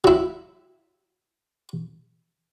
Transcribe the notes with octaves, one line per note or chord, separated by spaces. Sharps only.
F#3 E4